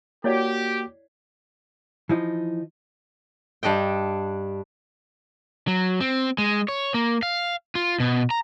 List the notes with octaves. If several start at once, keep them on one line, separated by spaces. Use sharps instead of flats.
A#3 E4 F#4 G4 C#5 D5
E3 F3 D#4
G2 D4 D#5 G5
F#3
C4
G#3
C#5
A#3
F5
F4
B2
A#5